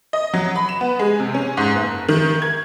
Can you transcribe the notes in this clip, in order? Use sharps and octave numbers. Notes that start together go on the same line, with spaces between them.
D#5
F#3
B5
E7
B3
G#3
C3
C#4
G#2
F#1
D#3
G#6